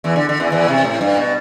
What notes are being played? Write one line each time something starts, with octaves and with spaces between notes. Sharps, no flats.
E2 E3
D3
D3
E2 E3
E2 E3
C3
A2
G2
B2